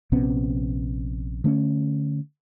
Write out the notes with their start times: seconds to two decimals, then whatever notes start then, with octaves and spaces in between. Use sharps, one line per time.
0.12 A#1 C3 B3 C#4
1.44 D3 A3 C4 C#4